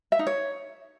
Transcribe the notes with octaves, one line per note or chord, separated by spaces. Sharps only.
E5
D#4
C#5